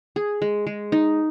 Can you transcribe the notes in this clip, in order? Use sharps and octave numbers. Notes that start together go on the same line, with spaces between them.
G#4
G#3
G#3
D#4